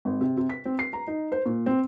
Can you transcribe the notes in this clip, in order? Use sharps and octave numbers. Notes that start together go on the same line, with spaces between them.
G#1
C3
C3
B6
C4
C7
A#5
D#4
C5
A#2
C4